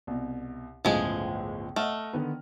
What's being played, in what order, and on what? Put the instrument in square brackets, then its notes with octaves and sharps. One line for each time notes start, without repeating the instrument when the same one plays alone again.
[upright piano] C2 B2
[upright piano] G1 C#2 A2 [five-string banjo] F3 G#3 G#4
[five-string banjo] A3 [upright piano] D#5 F#5 F6
[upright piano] D3 D#3 B3